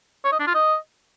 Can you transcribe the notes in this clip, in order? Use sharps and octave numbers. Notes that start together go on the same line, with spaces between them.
C#5
D#5
D4
F4
D#5